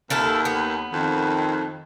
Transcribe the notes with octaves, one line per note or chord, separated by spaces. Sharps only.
D#2 E4 F4 A4
B3
F2 D#3